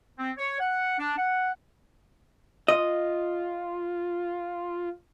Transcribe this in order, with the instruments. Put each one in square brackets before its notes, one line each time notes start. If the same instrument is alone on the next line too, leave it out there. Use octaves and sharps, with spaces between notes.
[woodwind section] C4
C#5
F#5
D4
F#5
[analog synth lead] F4 [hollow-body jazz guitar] D#5